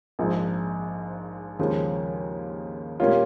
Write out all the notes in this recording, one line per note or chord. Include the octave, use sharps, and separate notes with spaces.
A#1 G#2 F3
D#2 C#3 F3 G#3
A#2 G3 A#3 C#4 F4